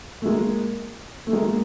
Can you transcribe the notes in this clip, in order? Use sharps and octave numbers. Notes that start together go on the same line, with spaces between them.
A3
G#3 A#3
A3
G#3 A#3